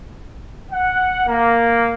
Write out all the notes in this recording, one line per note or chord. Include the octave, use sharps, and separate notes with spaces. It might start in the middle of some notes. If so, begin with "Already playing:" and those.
F#5
A#3